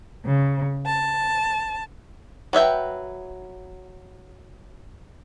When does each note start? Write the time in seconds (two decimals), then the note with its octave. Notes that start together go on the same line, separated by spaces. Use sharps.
0.26 C#3
0.86 A5
2.53 F#3 B4 E5 G5